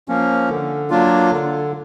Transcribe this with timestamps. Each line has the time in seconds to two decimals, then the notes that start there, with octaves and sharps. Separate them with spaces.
0.08 F3 A#3 C#4
0.49 D3
0.90 F#3 A#3 D4 F4
1.31 D3